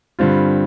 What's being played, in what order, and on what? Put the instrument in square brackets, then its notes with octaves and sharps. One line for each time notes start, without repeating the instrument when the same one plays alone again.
[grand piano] G2 D3 G3 C4 F4